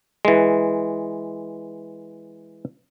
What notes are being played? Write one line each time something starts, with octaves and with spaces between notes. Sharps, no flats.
E3 G#3